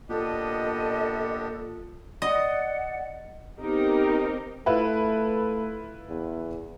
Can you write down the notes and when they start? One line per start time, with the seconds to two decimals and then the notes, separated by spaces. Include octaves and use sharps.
0.09 A#2 B3 D4 G4 A4 D#5
2.22 D5 D#5 F#5
3.60 B3 C4 D#4 G4 A#4
4.66 A3 E4 F4 B4
6.09 E2